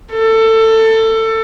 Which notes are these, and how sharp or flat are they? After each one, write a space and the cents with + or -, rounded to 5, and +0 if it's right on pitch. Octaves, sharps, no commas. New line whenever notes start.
A4 +20